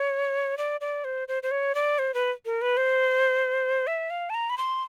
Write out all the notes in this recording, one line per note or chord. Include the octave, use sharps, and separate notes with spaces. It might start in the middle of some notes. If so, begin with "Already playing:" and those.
Already playing: C#5
D5
D5
C5
C5
C5
C#5
D5
C5
B4
A#4
B4
C5
E5
F5
A5
A#5
B5
C6